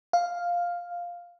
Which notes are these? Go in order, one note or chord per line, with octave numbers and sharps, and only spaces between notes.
F5